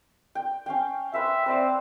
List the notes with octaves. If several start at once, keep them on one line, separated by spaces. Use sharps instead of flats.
G5
C#4 F5 G5
B4 C5 E5 F5
C4 B4 D5 F5